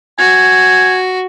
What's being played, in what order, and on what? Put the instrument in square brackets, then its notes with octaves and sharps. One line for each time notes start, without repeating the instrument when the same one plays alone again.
[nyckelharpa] F#4 [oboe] G#5